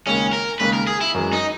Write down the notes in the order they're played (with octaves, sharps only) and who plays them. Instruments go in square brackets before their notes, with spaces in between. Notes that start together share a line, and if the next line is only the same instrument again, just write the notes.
[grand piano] D#2 C#3 G#3 [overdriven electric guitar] C#4
[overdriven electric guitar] A#4
[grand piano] D#2 C#3 G#3 [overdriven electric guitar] B4
[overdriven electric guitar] A#4
G#4
E4
[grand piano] F#2 E3 G#3
[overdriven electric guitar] D#4